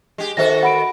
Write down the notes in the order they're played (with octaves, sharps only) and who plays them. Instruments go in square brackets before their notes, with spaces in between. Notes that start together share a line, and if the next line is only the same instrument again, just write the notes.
[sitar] G#3 G4
[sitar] D#3 F#4 A4 [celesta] C5 E5 A#6
[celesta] F#5 B5 D7